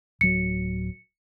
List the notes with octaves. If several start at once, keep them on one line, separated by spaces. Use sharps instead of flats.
D1 F#3 C#7